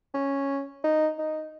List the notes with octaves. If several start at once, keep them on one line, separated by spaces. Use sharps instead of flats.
C#4
D#4
D#4